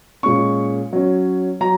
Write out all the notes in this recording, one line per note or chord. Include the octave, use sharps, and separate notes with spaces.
A#2 G#3 C#4 C#6
F#3 C#4
F#3 A#5